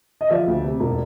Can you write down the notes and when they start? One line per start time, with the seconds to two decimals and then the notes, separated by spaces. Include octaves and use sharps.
0.21 D#5
0.30 F3 D5 E5
0.47 D2
0.64 C3
0.80 E1